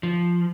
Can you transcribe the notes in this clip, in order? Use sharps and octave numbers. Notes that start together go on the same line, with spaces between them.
F3